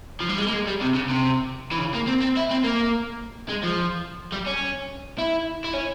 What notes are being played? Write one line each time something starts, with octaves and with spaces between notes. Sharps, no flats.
F3
G3
G#3
A#3
G#3
G3
C3
C#3
C3
E3
C#3
A#3
C4
C4
E4
C4
A#3
G#3
F3
G3
C#4
E4
E4
C#4